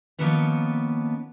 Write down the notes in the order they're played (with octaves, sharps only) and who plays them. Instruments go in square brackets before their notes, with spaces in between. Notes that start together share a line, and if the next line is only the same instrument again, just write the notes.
[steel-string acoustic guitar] D#3 F3 A#3 B3 C#4 B4